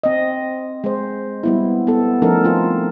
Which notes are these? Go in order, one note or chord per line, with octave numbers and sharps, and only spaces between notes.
C4 D#5
G#3 C5
G3 B3 E4
B3 A4
F3 A3 C#4 D#4 A4 A#4
C4 F4